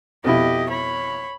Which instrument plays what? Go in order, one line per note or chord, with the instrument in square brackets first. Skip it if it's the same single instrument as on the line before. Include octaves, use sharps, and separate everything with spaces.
[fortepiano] F2 B2 E4 [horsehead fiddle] G4 D#5
[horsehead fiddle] C#5 B5